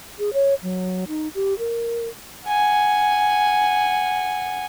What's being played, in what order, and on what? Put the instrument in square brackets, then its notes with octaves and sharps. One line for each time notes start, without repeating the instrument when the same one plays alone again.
[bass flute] G#4
C#5
F#3
D#4
G4
A#4
[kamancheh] F#5 G#5